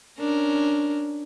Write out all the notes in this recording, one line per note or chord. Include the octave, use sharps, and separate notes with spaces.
C#4 D4 A#4